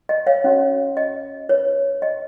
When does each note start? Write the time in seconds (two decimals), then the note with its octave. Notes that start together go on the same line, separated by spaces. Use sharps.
0.09 D#5
0.27 C#5 F5
0.44 C#4 F#4 C#5
0.97 D#5
1.49 F4 B4 C#5
2.02 D#5